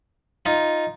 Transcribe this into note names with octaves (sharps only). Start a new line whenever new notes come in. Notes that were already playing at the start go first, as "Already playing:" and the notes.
D#4 F4